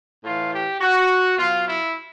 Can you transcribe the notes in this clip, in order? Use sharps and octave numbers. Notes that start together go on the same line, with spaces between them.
A2 E3 F4
G4
F#4
B2 F#3 F4
E4